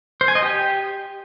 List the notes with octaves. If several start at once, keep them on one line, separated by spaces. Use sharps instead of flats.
C5
G#5
D#5
G4